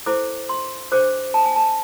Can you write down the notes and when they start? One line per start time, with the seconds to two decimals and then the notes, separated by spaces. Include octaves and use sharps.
0.06 E4 A4 C5 D6
0.49 C6
0.92 D4 G#4 C5 D6
1.34 A5
1.45 G#5
1.56 A5